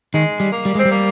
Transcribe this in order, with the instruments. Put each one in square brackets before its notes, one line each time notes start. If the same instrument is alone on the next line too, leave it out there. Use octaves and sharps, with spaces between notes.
[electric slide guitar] D#3 [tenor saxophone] G#3
[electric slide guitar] G3
[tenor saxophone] A#3
[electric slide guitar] G3
[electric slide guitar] G#3 [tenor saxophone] C4
[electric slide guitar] G3
[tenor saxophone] A#3